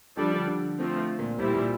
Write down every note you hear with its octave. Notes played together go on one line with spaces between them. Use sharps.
F3 G3 D4 A4 D5
D3
D3
F3 A3 C4
A#2
A#2 G3 C4 E4
A#2